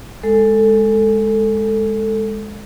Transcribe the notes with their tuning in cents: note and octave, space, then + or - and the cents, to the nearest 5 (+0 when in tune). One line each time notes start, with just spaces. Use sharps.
G#3 +0 A4 +10